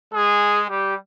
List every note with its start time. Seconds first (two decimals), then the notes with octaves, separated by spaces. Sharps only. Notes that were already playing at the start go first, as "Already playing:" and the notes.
0.13 G#3 G#4
0.69 G3 G4